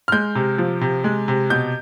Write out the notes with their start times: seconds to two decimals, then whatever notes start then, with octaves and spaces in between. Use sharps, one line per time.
0.08 F6
0.12 G#3 G6
0.35 C3
0.58 F3
0.81 C3
1.04 G#3
1.28 C3
1.50 B2 G6